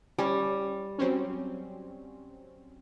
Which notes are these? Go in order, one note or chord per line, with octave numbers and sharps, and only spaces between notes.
G3 C#4
F#3 C4 C#4